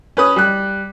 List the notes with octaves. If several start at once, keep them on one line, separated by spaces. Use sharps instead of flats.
C#4 B4 D#6
G3 F#6